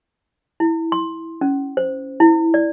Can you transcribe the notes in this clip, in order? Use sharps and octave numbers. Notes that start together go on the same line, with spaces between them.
E4
C6
C#4
C5
E4
D5